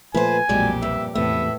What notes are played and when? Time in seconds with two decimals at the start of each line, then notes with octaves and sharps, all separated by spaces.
0.14 A#2 F3 A3 B4 C5 G#5
0.49 B1 F2 A#2 F#3 G#3 G4 D5
0.82 G2 E5
1.15 E2 A2 C3 A3 B3 E5